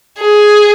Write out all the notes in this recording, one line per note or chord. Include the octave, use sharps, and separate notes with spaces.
G#4